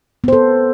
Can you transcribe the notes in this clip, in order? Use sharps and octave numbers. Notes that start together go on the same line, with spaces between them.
B3 A4 C5